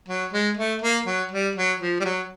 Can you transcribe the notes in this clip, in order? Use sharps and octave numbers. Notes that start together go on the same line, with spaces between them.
F#3
G#3
A3
A#3
F#3
G3
F#3
F3
G3
F#3